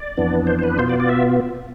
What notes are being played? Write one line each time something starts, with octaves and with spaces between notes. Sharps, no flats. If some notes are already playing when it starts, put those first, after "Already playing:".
Already playing: D5
F2 E3 B3 D4
C5
C5
B4
B2 B3 F4 C5
D5
D5
E5